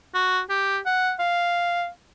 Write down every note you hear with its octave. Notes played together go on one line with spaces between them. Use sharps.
F#4
G4
F#5
F5